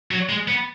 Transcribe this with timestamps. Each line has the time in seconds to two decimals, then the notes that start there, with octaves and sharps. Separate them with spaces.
0.11 F#3
0.29 G#3
0.48 B3